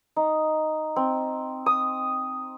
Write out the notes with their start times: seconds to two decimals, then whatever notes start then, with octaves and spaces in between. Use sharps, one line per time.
0.16 D#4
0.96 C4
1.66 D#6